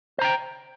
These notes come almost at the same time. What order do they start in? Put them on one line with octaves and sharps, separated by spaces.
C5 A#5 G5